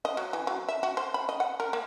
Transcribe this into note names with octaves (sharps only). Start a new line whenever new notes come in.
D#5
F#3
E3
F#3
E5
F#4
C5
B5
D#5
F#5
A#4
A#3